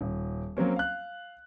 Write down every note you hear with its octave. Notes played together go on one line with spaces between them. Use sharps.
D#1
F#3 A#3 C4 C#4
F5 F#6